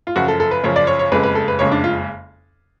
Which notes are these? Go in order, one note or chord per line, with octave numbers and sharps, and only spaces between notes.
F4
F#2 C#3 F3 F#4
A4
A4
B4
F#2 C#3 F3 C#5
D5
C#5
C#5
F#1 F2 C#3 G#3 B4
B4
A4
B4
F#1 F2 C#3 G#3 C#5
D4
F4